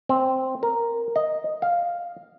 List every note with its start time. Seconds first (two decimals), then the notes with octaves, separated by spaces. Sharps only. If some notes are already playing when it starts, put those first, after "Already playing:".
0.09 C4
0.63 A#4
1.16 D#5
1.62 F5